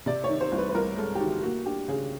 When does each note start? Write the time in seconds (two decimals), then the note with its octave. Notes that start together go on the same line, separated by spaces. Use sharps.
0.06 C3 D5
0.24 C#5
0.29 D#3
0.40 C5
0.52 C2
0.58 B4
0.69 B4
0.75 C2 A#4
0.98 G#3 A4
1.15 G4
1.20 D#3 F#4
1.42 A#3 F#4
1.66 D4 G4
1.88 C#3 G#4